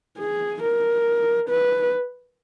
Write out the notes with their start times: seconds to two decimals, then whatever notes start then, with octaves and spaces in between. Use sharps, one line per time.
0.19 G#4
0.62 A#4
1.49 B4